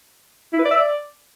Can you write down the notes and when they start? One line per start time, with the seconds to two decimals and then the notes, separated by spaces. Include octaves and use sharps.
0.53 E4
0.59 B4
0.65 D5
0.71 E5
0.77 D5